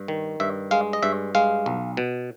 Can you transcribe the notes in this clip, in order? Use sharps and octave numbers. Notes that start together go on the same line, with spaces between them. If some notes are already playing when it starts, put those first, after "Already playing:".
Already playing: G2
D#3
G2 E5
G#3 F5
D#5
G2 E5
G#3 F5
B1
B2